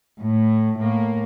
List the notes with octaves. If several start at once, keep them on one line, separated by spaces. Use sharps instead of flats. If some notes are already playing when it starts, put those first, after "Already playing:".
A2
A2 A#3